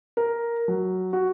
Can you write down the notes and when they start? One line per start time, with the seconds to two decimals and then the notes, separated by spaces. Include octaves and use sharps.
0.17 A#4
0.68 F#3
1.13 F#4